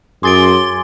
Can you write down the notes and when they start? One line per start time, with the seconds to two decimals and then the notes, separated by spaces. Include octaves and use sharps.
0.23 F#2 G#4 C6 D6 A6 D7